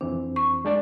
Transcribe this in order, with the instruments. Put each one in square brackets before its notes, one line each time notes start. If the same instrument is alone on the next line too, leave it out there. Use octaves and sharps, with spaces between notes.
[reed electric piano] F2 E3 C4 [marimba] D4
[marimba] C#6
[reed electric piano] G#3 D4 D5